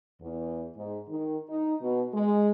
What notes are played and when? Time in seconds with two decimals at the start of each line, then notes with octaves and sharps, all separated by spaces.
0.21 E2
0.76 G#2
1.09 D#3
1.49 D#4
1.81 B2
2.13 G#3